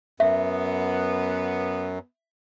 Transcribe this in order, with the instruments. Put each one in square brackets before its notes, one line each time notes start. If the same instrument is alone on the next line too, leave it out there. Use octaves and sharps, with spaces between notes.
[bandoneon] F#2 [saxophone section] B3 [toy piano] E5